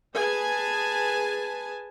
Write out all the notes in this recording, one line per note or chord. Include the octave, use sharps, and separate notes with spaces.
G#4 B4 G#5 A5